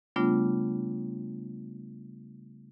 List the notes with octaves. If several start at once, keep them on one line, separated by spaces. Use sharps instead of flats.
C#3 G3 A3 B3 D4 F4